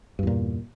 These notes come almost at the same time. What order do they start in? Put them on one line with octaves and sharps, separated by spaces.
G2 E2 A#2